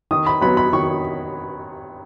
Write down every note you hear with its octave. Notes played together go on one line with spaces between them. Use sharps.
D#3 D#6
B5
F#3 B3 B5
B5
D#3 C#6